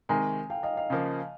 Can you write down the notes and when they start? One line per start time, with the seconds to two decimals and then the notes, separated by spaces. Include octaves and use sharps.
0.09 C3 D#3 G#3 G#5 A#5
0.50 F5 G5
0.63 D#5 F5
0.77 D#5 F5
0.90 C#3 F3 A#3